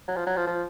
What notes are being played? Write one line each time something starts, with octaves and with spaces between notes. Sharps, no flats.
F#3
F3
F#3
F3
F3